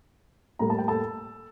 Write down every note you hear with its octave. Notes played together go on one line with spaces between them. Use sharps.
A2 G3 A#3 A#5
A5
G5
A4 A5